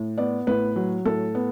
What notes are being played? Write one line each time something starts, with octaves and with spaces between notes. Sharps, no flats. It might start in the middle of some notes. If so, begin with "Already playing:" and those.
Already playing: A2
B3 D5
A2 B4
F#3
A2 A4
B3